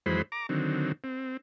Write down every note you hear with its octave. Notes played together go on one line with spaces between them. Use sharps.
F2 E3 F#3 G#3 C5 B5
A#5 D6
D3 D#3 F#3 C4
C4